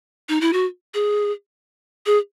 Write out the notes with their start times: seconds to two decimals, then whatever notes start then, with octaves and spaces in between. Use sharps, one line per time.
0.29 D#4
0.41 E4
0.53 F#4
0.94 G#4
2.06 G#4